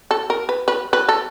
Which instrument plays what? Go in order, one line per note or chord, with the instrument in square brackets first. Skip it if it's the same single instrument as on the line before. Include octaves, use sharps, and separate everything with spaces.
[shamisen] A4
A#4
B4
B4
B4
A4